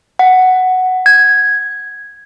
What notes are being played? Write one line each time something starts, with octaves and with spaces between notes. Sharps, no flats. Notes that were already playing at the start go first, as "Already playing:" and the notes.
F#5
G#6